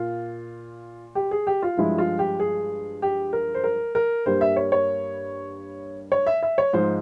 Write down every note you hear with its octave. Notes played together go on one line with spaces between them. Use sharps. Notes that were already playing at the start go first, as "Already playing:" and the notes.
Already playing: A#2 F4
G4
G#4
G4
F4
G2 F3 G#3 E4
F4
G4
G#4
G4
A#4
C5
A#4
A#4
G2 G3 A#3 C5
E5
C#5
C#5
C#5
E5
E5
C#5
G#2 F3 G#3 C5